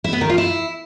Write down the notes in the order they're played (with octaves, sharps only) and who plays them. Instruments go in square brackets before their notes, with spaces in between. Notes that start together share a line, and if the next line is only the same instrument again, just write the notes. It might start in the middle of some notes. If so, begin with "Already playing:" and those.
[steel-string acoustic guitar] E4
B3
D#3
F4
E4